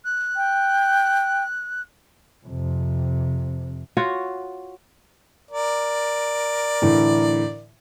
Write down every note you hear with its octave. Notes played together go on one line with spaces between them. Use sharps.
F#6
G5
F2 C3
F4 F#4 C#5
A#4 D5
A2 D3 E3